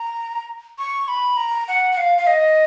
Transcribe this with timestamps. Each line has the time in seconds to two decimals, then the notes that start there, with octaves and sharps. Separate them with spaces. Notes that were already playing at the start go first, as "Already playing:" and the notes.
Already playing: A#5
0.78 C#6
1.08 B5
1.37 A#5
1.68 F#5
1.92 F#5
1.97 F5
2.18 F5
2.27 D#5